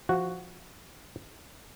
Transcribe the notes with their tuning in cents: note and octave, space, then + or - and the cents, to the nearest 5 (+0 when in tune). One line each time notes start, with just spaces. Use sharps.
F3 +0 F#4 +0